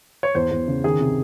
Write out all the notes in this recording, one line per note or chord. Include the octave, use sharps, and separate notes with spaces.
C#5
E2 C5
E2
C#3
D#3 G#4
C3